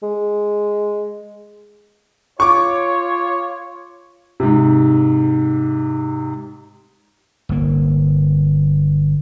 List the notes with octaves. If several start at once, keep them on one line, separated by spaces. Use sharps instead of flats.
G#3
F4 C#5 C#6 D6
G#2 C3
G1 A#3